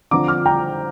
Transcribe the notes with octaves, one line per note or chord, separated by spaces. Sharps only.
D3 F3 C4 A#5 D6
D6 F6
G5 A#5